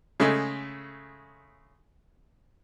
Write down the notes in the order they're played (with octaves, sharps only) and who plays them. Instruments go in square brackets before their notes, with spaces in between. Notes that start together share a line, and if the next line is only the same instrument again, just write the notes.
[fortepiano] C#3 G#3 A3